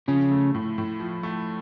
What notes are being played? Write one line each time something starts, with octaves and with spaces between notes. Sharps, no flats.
C#3 F3 C#4
A3
A2
A2
F3
A3